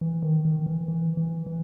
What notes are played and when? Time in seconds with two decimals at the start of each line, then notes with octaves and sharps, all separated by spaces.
0.01 E3
0.22 D#3
0.45 D#3
0.66 E3
0.88 E3
1.17 E3
1.46 E3